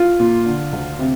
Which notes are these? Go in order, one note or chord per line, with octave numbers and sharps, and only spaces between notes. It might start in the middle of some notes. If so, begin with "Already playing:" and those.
Already playing: F4
A#2
D3
D2
C3